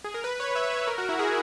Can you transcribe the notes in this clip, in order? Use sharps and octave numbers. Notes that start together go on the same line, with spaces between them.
G#4
A#4
B4
C#5
E5
B4
A#4
F#4
E4
G#4